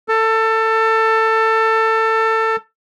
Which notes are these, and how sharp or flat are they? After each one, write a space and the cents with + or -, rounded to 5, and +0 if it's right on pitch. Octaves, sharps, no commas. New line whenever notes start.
A4 +20